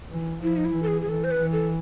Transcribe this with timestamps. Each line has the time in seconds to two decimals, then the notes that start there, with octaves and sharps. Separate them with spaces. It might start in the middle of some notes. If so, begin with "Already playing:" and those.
0.10 E3
0.43 F3 E4
0.57 D#4
0.65 E4
0.76 E3
0.83 A4
0.87 G#4
1.02 G#4
1.09 E3 A4
1.24 C5
1.31 B4
1.41 E3
1.52 A4